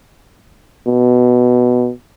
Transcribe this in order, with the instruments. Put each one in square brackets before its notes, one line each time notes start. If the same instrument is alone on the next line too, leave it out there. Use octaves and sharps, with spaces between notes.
[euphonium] B2